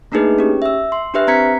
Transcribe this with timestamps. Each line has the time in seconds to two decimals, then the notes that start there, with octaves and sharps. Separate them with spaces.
0.12 A3 A#3 D4 D#4 G#4 B4
0.38 C#4 G4
0.62 E5 E6
0.92 C6
1.14 D4 G4 B4 E5 F#6
1.28 C4 A#5 G#6 B6 C#7